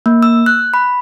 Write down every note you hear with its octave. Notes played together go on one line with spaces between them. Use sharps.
A#3
E6
F#6
B5